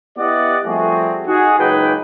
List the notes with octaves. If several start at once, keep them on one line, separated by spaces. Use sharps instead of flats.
B3 E4 G4 D5 D#5 F#5
F3 G3 A3 C4 F#4 G#4
D#4 F#4 G#4
F#1 C#2 D#4 G#4 B4 G5